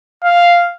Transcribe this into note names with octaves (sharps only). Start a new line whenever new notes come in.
F5